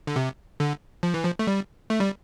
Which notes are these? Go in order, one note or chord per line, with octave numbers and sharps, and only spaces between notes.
D3
C3
D3
F3
E3
F3
A3
G3
A3
G3